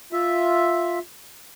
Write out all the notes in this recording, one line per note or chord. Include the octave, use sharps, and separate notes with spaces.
F4 E5